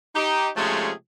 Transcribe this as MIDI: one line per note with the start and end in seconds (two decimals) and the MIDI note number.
0.15 0.49 63
0.15 0.49 67
0.56 0.92 48
0.56 0.92 53
0.56 0.92 56
0.56 0.92 57
0.56 0.92 61
0.56 0.92 68